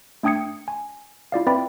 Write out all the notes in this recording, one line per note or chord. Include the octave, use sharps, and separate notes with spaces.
A3 D4 G5 D#6 G#6 C#7
G#5
E4 F4 D5 F5
C4 B4 D5 E5 G5 B5